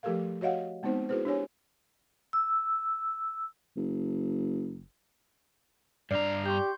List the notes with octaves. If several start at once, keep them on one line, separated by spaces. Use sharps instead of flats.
F3 A3 G4 A4 A#4 F5
F#4 C#5 D#5 F5 F#5
G#3 B3 C4 D#4 C5
E4 F#4 G#4 B4 C5
D4 G4 C#5 G#5
E6
F#1
G2 D4 D5 A#5 F6 C7
G4 C6 C#6 G6